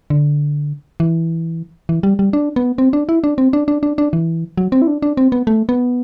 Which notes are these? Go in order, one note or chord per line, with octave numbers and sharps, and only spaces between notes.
D3
E3
E3
G3
G3
D4
B3
C4
D4
E4
D4
C4
D4
D4
D4
D4
E3
F#3
C4
E4
D4
D4
C4
B3
A3
B3